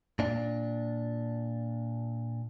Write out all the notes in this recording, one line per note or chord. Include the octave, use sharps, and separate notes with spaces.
A#2 D4